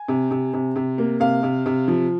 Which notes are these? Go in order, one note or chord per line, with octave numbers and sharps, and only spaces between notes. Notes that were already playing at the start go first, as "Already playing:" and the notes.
Already playing: G#5
C3
C3
C3
C3
A#3
C3 F5
C3
C3
F3